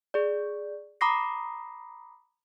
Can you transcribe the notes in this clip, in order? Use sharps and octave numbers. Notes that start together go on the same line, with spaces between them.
G#4 D5
A#5 B5 D6 D#6 A#6 C7